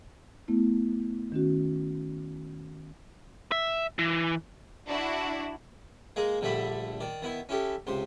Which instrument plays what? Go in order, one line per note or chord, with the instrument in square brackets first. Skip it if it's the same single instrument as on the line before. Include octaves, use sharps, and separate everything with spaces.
[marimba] A3 B3 E4
D#3 C#4 F#4
[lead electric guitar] E5
E3
[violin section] D4 E4 F#4
[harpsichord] G#3 A#3 G#4 A#5
A#1 D3 G3 A3 A4 B5
D#3 D5
D#3 B3 E4
C#4 E4 G4 A4
C#2 C3 C5